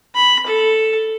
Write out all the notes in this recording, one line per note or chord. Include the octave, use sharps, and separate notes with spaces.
B5
A4